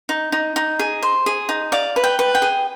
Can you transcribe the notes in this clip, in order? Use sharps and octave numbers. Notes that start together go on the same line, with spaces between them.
D#4
D#4
D#4
G#4
C5
G#4
D#4
D5 F5
B4
G5
B4
G5
G#4